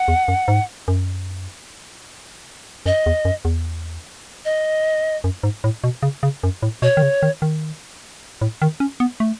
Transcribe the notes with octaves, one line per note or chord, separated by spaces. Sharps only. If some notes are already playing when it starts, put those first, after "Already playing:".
Already playing: F#5
E2
F#2
G#2
F#2
F#2 D#5
E2
F#2
E2
D#5
F#2
G#2
A2
B2
C#3
C#3
F#2
A2
B2 C#5
D#3
C#3
D#3
D#3
A2
D#3
C#4
B3
A3